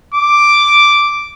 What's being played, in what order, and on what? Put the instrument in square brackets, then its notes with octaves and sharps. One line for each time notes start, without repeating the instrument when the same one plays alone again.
[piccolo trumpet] D6